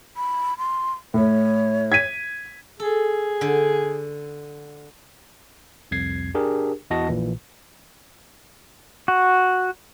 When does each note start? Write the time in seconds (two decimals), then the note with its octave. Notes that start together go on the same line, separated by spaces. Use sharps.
0.17 B5
0.58 C6
1.14 A2 C#5
1.92 G#6 B6 D#7
2.80 G#4 A4
3.41 D3
5.91 C2 F2 G#6 C7
6.35 D4 G4 G#4 A#4
6.90 E2 E4 F#4 D#5 A5 A#6
7.09 A#1 A#2 E3
9.08 F#4